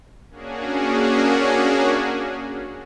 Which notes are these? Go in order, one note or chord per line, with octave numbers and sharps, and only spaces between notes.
A#3 C#4 D4 F#4 G#4